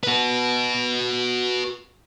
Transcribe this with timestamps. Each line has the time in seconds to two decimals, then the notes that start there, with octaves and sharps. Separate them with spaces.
0.03 F#4 B4